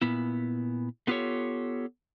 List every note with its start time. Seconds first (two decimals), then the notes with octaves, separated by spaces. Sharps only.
0.02 A#2 B3 E4
1.07 A3 B3 F4 G4 A4 C#5